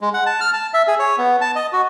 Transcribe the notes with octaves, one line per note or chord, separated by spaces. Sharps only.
G#3
F#5
A5
F6
A5
E5
G#4
C#5
B3
A5
D#5
F#4